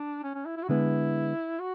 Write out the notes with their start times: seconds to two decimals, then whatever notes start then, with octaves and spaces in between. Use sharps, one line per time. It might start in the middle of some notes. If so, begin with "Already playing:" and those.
Already playing: D4
0.24 C#4
0.35 C#4
0.45 E4
0.57 E4
0.63 F#4
0.69 D3 G#3 B3 E4
1.59 F#4